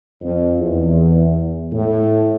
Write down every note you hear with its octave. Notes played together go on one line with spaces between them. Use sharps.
F2
E2
A2